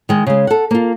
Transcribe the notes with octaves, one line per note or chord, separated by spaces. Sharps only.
D#3 G#3
C#3 G#3
A4 F#5
A#3 F4